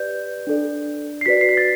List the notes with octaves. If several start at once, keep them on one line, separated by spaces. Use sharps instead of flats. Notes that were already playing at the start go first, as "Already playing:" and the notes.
Already playing: G4 B4 D5 G6
D4 A4 D5
C7
F#4 B4 D5 B6
C7
B6
A6